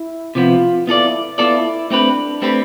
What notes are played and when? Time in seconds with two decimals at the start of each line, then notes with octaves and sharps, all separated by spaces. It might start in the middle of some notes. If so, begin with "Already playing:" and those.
Already playing: E4
0.35 C3 F3 B3 F4
0.87 B3 E4 F4 A4 D5
1.38 B3 E4 F4 A4 D5
1.90 A3 C4 D4 G4 B4
2.42 A3 C4 G4 B4